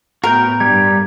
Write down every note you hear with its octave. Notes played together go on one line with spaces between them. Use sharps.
A2 B3 F#4 A#4 G5
G2 G3 G4 G#6